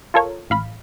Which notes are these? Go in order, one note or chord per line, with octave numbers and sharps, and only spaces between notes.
F4 A4 A#4 C#5
A1 F5 B5